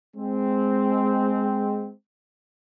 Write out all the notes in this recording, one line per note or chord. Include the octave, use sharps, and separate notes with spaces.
G#3 C4